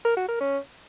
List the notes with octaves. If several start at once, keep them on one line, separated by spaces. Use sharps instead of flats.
A#4
F#4
A#4
C#4